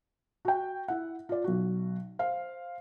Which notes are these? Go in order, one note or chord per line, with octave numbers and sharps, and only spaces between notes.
F#4 G5
E4 F#5
F4 D5
B1 F#4
C5 F5